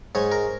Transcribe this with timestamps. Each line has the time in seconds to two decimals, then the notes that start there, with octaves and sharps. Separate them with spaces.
0.15 G#2 G#3 C#5
0.32 A#4